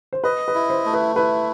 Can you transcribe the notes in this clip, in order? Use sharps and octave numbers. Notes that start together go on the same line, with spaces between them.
C5
B4 D#5
B4
E4
C5
A3
B4
E4 B4